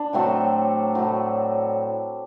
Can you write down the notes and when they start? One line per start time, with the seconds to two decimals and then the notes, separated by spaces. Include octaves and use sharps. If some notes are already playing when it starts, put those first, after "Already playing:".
Already playing: D4
0.13 A2 F#3 A3 C4
0.95 A2 F#3 A3